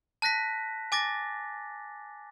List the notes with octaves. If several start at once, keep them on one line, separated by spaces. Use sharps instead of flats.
A5 F#6 A#6 B6
G#5 D6 A6 A#6